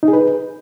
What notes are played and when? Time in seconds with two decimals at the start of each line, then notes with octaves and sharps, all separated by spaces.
0.03 D#4
0.08 G#4
0.13 B4